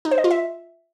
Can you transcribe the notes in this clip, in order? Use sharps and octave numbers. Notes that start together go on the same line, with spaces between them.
D#4
C5
D#5
F4
E5